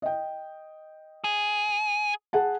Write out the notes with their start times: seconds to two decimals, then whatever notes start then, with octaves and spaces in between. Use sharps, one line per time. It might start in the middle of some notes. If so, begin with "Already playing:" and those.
0.02 D#5 G5
1.24 G#4
2.33 G#4 F#5 A5